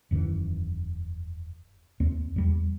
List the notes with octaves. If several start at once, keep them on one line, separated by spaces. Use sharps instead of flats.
E1 F#2 D#3 E3
D#2 C4
E2 G3